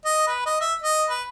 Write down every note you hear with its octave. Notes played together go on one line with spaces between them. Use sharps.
D#5
B4
D#5
E5
D#5
B4